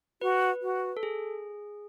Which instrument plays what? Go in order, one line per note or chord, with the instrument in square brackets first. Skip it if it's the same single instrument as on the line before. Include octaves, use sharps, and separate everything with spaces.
[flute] F#4 [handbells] B4
[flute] F#4
[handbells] A4
G#4